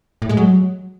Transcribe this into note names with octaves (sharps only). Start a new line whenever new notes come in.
A2
G#3
F#3